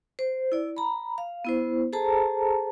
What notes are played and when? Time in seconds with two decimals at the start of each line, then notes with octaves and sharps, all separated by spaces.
0.19 C5
0.52 E4 D5
0.77 A#5 B5
1.18 F5
1.45 B3 E4 C5
1.93 G#4 A4 C5 A5 A#5